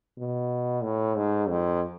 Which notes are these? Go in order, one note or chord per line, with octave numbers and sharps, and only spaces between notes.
B2
A2
G#2
F2